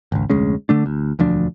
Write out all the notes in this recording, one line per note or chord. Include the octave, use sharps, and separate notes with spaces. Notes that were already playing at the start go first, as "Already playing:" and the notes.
G#1 C#2
F1 D2 G#3 C#4
D3 A3 D4
D2
E1 D2 F3 D4